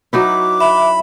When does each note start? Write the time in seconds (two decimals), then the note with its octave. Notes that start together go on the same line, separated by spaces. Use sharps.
0.13 F#3 D#4 E4 B4 D6
0.60 E5 B5